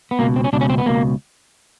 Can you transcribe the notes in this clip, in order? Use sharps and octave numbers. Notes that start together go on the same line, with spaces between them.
B3
C#2 B2 A#3
C4
C#4
C#2 B2 D4
C#4
C4
B3
C#2 B2 A#3